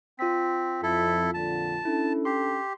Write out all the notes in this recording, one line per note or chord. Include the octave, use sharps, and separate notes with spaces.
C4 F4 B6
F2 E4 A4
A#1 F2 D3 A5
C#4 D4 E4 A4
G4 C6